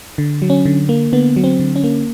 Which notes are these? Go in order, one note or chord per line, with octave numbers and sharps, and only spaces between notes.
D3
F#3
C#4
D3
A#3
D3 B3
F#3
C4
D3
C#4
A#3